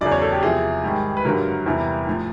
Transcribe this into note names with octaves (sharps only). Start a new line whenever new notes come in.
E2 C#3 F#3 D5
C#5
A4
G4
E2 C3 F3 G#4
G#2 D#3 G3
B4
G2 D3 F#3 A#4
E2 C3 E3 G3
A2 F3